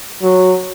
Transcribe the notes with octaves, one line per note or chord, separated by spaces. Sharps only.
F#3